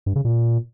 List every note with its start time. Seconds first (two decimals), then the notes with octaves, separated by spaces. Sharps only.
0.06 G2
0.15 C#3
0.25 A#2